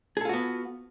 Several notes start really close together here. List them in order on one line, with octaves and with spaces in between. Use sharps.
G#4 A4 F4 F#4 B3